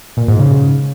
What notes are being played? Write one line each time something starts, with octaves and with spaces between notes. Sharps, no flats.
A#2
G#2
C#3